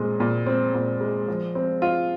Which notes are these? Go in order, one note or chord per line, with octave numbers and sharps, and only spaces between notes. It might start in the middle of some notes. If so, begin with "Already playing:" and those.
Already playing: A#2 G#3 C4
A#2
C4
A#2
G#3
F3
C4
F4